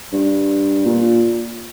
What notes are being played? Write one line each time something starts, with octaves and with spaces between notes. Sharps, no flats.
G2
A#2